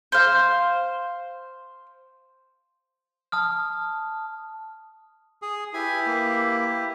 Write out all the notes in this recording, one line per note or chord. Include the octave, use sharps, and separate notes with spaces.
C5 F5
A5 D#6 F6
G#4
E4 G4 B4 G#5
A#3